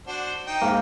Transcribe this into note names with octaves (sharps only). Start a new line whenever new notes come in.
D4 F#4 C5
D#4 G5
G#2 A#3